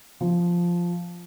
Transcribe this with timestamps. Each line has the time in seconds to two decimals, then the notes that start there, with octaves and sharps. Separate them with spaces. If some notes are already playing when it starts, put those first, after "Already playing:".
0.21 F3